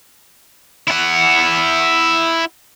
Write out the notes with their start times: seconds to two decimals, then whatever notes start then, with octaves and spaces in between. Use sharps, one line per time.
0.88 E4 F#5